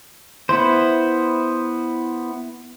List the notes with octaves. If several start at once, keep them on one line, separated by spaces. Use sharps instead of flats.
B3 E4 C5